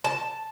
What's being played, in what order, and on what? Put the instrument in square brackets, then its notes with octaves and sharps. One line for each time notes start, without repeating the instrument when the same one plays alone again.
[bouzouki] A5